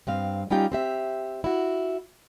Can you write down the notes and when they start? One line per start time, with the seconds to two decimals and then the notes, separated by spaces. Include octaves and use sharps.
0.07 G2 C4 F5
0.50 G3 C#4 D#4 F4 G4 G5
0.72 C4 G4 E5
1.44 E4 F#4